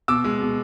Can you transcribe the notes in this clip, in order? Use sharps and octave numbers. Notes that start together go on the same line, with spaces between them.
B2 D6 E6
G#3
B2